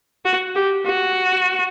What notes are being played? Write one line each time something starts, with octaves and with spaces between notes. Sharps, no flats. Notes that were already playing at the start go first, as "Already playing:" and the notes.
F#4
G4
F#4